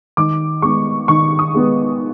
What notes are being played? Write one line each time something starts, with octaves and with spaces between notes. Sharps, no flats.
D#3 D6
G#3 B3 C#6
D#3 C#6
D#6
G#3 B3